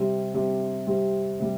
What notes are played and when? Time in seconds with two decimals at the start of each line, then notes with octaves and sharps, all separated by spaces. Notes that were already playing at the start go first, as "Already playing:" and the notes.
Already playing: C3 G3 C4
0.34 C3 G3 C4
0.87 C3 G3 C4
1.40 C3 G3